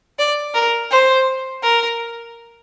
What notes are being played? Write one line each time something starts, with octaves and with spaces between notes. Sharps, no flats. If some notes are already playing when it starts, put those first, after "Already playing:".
D5
A#4
C5
A#4